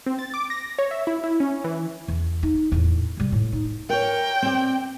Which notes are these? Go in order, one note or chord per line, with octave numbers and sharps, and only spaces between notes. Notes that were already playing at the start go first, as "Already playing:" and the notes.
C4
A6
D6
A#6
C#5
E5
E4
E4
C#4
E3
E2
D#4
E2 A2
C3 G3
A2
D#4
A#4 C#5 G5
C4 D5